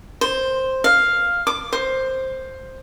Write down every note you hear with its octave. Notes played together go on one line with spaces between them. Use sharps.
C5
F5
D6
C5